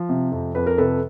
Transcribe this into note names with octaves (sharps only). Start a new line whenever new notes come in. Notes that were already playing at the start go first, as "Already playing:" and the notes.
Already playing: F3
C3
F2
F2 B4
A#4
C3 A4 B4